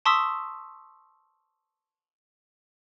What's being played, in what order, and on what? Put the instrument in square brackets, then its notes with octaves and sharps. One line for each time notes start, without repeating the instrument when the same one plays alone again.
[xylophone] A5 C6 C#6 D#6 E6 B6